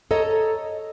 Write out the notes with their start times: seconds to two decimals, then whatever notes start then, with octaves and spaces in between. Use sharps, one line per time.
0.11 A4 C#5 D#5 A#5